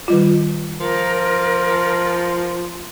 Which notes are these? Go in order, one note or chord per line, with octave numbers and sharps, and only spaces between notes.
D#3 G3 F4
F3 A#4